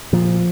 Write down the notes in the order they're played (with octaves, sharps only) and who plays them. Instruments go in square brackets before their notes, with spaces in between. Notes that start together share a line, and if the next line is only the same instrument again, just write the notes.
[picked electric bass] A#2 F3